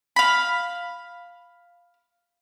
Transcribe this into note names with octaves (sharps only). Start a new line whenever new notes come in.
F5 B5